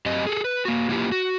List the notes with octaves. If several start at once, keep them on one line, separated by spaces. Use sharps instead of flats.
F#2 C4 G4 D#5
G#4 A4
B4
A#3 F#4
A#3 E4 F4 G4
F#4